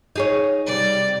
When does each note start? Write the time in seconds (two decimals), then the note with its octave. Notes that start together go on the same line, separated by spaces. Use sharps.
0.16 D#4 G#4 C#5
0.66 C3 G3 D5